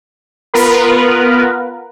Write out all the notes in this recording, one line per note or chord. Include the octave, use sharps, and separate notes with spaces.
B3 F4 A#4 B4